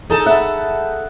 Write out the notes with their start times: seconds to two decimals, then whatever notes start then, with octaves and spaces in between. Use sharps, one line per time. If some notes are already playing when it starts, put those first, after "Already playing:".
0.10 D#4 G#4 A4 A5
0.26 E5 F#5 B5